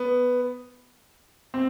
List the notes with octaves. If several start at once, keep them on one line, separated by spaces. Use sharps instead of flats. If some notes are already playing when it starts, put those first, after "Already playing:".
Already playing: B3
C4